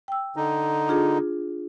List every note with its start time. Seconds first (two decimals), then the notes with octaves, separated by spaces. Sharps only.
0.08 G5 E6
0.36 D3 D#4
0.88 D4 F4 G#4